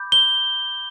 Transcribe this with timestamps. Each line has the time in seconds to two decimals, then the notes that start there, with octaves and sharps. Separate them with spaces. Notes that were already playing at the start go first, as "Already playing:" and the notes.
Already playing: B5 D6 G6
0.12 G7